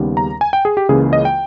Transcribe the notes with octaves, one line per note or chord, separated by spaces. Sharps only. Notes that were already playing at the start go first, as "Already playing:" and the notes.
Already playing: D#2 C#3 G3 B3 D#4
A#5
G#5
G5
G#4
G4
C#2 C#3 E3 A#3 G#4
D#5
G5